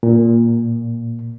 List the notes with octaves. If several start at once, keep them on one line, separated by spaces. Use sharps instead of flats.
A#2